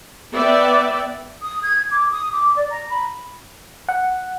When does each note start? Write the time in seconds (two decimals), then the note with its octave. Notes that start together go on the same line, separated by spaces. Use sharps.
0.32 B3 B4 D5 E5 G5
1.42 D#6
1.63 G#6
1.91 D6
2.12 D#6
2.32 D6
2.56 D5
2.70 A#5
2.90 B5
3.89 F#5